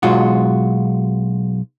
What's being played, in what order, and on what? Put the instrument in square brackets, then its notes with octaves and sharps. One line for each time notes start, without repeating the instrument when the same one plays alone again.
[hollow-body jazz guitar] B1 G#3 F4 F#4